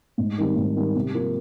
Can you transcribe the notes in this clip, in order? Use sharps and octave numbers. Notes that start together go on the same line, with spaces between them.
G#2
D#3 G3 C4
G#2
D#3 G3 C4
C3
F3 A#3